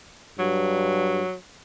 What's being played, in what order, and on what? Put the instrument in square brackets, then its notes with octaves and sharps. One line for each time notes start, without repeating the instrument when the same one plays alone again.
[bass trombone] G2 [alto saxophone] F#3